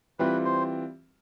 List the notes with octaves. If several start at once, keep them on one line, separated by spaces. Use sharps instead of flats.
E3 G3 C4 F4 B4
C5